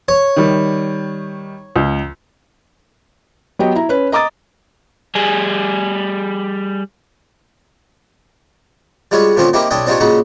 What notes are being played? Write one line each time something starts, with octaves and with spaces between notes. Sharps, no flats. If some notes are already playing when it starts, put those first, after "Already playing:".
C#5
D#3 G3
C#2
F#3 B3 F#4 G4 D#5
E4 A#5
C#4 B4
D#5 A#5 D6 D#6 A6
G3 G#4
G3 G#3 F4 F#4 C#5
A#2 D3 F3 C4 C#4 F4
A#3 C4 D#4 E4 G4 A#4
B1 C#4 D4 D#5 G5
C4 D4 D#4 F4 G4 C#5
A#2 C#3 D#4 F#4